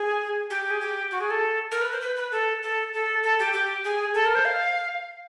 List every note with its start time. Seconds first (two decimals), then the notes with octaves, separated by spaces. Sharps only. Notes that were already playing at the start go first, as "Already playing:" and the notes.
Already playing: G#4
0.50 G4
0.70 G#4
0.81 G4
1.11 F#4
1.20 G#4
1.30 A4
1.71 A#4
1.81 B4
1.92 C5
2.01 B4
2.16 B4
2.32 A4
2.62 A4
2.93 A4
3.23 A4
3.39 G4
3.53 G4
3.84 G#4
4.14 A4
4.25 A#4
4.35 C5
4.45 F5